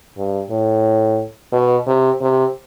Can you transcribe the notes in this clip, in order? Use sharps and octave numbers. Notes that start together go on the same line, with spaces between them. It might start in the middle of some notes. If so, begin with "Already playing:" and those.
G2
A2
B2
C3
C3